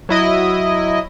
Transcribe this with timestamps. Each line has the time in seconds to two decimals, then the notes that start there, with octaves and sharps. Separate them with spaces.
0.09 F#3 E4 D#5